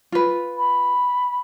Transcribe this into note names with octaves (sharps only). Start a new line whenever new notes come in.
F4 B4
B5